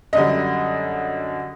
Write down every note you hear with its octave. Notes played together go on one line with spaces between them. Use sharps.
F#2 D3 G3 D#5